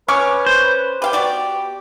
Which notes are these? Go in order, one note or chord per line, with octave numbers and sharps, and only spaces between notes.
C#4 B4 C#6 D6 F6
C5
G4 B4 F5 G5
B3 F#4 D5